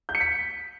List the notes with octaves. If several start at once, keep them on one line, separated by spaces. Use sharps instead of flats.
G6
C#7
B6